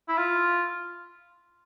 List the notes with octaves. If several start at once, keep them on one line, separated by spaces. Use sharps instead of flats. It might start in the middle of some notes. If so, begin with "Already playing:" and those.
E4
F4